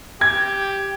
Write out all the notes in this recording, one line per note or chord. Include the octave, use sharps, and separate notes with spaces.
G4 G#6